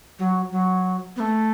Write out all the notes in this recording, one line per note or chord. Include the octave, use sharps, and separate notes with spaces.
F#3
F#3
B3
A3